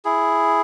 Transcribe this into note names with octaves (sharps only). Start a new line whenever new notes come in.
E4 G#4